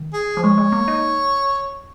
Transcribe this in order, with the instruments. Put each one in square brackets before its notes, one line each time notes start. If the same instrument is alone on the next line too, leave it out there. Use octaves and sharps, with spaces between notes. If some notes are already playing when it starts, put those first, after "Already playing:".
Already playing: [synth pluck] D#3
[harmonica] G#4
[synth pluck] F3
[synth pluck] G#3 [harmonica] C#5
[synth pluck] G#3
A#3
D#4